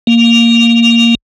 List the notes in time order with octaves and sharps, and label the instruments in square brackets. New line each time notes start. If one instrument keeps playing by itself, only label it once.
[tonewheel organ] A#3